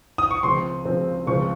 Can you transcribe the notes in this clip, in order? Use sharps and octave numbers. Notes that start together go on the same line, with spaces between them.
D#6
C#6
C#2 C#3 F3 C4 C6
C#2 C#3 F3 C4
C#2 C#3 F3 C4 C#6